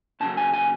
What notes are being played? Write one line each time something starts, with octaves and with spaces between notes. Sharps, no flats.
D#2 C#3 F#3 A5
G#5
G#5